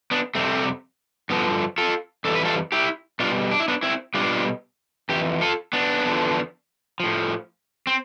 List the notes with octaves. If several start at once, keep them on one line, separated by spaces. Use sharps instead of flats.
B3 D4
F2 C3 G3 A3 C4
G2 D3 F3 B3
F4 A4
F2 E3 G3 A4
B4
F4 A4
E4 G4
B2 G3 D4 F4
D4
E4
B3 D4
C4 E4
B2 G3 D4 F4
F2 E3 G4
F4 A4
B3 D4
E2 D3 F3
A2 F3
C4